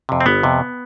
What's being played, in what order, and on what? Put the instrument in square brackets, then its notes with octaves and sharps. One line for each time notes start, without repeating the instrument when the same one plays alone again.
[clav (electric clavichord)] F2 C3
C4
G1 B3
F2 C3